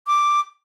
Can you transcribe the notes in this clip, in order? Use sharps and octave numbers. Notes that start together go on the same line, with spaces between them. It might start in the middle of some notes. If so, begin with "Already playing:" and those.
D6